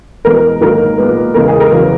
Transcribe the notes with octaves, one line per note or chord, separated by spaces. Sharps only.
E2 B2 G#3 B3 A#4
G#2 D#3 F#3 A#3 A#4
A#2 G#3 B3
E2 C#3 G#3 A#4
G#4
A#4
E2 C#3 F#3 B3